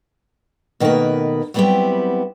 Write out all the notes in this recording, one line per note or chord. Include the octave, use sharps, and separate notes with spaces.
B2 D#3 A3 A#3 A#4 B4
F#3 G3 B3 C4 E4 G4